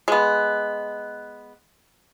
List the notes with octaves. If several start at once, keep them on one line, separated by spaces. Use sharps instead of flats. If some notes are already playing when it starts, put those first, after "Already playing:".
G#3 B3